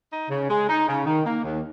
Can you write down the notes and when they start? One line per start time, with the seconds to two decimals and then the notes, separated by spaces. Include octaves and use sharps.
0.12 D#4
0.30 C#3
0.49 G#3
0.69 D#4
0.88 C#3
1.06 D#3
1.25 A#3
1.44 D#2